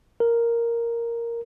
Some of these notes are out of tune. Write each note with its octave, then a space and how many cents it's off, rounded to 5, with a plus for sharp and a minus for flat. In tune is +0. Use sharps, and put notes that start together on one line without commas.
A#4 +0